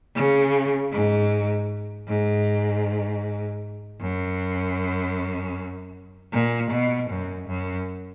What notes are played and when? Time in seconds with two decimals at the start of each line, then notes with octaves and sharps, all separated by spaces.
0.15 C#3
0.92 G#2
2.08 G#2
4.01 F#2
6.33 A#2
6.71 B2
7.10 F#2
7.48 F#2